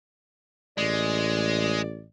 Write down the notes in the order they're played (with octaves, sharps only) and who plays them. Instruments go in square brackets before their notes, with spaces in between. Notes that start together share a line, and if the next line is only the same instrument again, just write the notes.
[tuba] A1 [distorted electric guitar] G#3 [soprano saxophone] D5